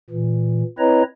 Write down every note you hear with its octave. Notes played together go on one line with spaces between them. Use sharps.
A#2 E3
C4 E4 B4 C#5 D#5 A#5